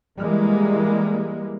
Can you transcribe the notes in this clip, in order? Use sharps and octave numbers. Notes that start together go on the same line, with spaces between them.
E3 G3 G#3 A#3